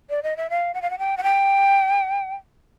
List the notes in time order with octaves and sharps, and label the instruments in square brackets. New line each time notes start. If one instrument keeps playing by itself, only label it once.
[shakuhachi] D5
D#5
E5
F5
F#5
F5
F#5
G5
F#5
G5